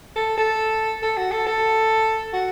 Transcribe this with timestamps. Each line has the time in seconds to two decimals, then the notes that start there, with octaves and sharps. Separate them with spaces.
0.16 A4
0.38 A4
1.03 A4
1.17 F#4
1.32 A4
1.46 A4
2.33 F#4